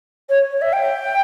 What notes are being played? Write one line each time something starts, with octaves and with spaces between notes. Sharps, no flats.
C#5
C#5
E5
G5